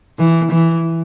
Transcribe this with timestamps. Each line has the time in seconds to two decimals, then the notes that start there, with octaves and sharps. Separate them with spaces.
0.19 E3
0.51 E3